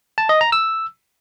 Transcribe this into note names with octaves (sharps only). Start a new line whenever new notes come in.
A5
D#5
A#5
E6